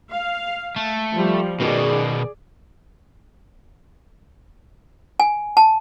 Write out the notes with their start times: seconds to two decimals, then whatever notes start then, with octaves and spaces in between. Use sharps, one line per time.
0.11 F5
0.76 A3
1.13 F3 G3
1.60 B2 D#3 G#4 D5
5.20 G#5
5.57 A5